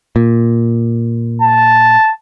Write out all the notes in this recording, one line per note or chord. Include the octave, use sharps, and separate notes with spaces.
A#2
A5